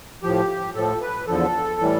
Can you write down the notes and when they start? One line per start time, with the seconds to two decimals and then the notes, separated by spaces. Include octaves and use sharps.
0.23 A2 F3 G4
0.75 A2 F3 A4
1.01 B4
1.28 E2 D3 F3 A4
1.80 A2 E3 G3